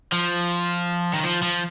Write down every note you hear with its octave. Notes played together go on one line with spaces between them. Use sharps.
F3
D#3
F3
F3